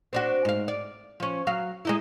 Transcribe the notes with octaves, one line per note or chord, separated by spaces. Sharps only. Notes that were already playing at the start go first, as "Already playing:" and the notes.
C4 D4 F#4
G#2 F5
D5
F3 C#4
F#3 F5
G#3 D#4 E4